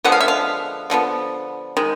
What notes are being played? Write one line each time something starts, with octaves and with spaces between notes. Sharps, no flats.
D3 F3 G#3 B3 F#5
F5
E5
F5
D3 F3 G#3 B3
D#3 G#3